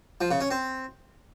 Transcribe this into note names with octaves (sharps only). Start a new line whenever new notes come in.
F3
C#3
C#4
C4